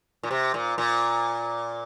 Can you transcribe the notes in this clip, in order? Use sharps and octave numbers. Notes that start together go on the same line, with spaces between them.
A#2
C3
A#2
A#2